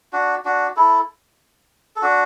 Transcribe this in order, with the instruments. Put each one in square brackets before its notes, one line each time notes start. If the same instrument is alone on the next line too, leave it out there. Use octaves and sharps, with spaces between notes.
[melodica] D4 F#4
D4 F#4
E4 A4
A4
D4 F#4